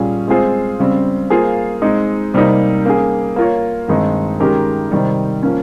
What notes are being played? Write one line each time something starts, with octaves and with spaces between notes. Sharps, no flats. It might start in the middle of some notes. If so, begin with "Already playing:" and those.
Already playing: A#2 G3 C#4 G#4
G#3 C4 F4 G#4 C5
C#3 G3 C4
A#3 F4 G#4 C5 F5
G#3 C4 D#4
C3 G3 A#3 D#4
A#3 C#4 G#4
A#3 F4 A#4 C#5
G2 D#3 G#3 C4 D#4
D#3 G#3 C#4 G4 A#4
C3 D#3 G3
F3 A#3 C#4